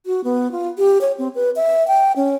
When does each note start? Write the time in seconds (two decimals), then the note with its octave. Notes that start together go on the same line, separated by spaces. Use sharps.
0.06 F#4
0.24 B3
0.52 F4
0.78 G4
1.01 C#5
1.18 C4
1.35 B4
1.56 E5
1.88 G5
2.16 C#4